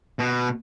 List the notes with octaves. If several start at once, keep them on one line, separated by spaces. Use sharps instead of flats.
B2